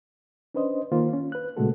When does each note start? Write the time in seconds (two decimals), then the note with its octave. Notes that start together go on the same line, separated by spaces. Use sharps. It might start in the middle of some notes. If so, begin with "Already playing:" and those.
0.54 C#4 D4 B4 C5 D#5
0.92 D#3 A#3 F4 C5
1.13 C#4
1.32 B4 F#6
1.57 A#2 C#3 G#3 A3 F#4 A4